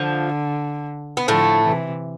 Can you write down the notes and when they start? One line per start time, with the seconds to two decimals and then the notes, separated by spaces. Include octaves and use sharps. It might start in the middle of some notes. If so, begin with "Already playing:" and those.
Already playing: D3 F3
1.17 B3
1.28 A2 D3 F3 A3
1.64 C3 E3